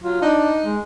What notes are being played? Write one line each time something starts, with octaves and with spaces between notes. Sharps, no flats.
F#3 F4
D4 D#4
G#3